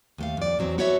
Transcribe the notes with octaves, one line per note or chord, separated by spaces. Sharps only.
D#2 A3 F5
F2 D5
E2 F#3 C4
B3 F#4 A4 C#5 D5 E5